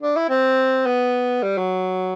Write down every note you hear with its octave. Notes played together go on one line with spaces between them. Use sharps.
D4
E4
C4
B3
G3
F#3